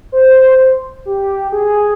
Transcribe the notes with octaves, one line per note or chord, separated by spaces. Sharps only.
C5
G4
G#4